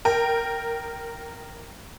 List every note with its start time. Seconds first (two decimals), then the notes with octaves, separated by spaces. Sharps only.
0.05 A#4 G5